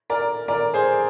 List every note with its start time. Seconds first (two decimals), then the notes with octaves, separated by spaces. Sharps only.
0.10 A#4 D5
0.48 A#4 D5
0.74 G#4 C5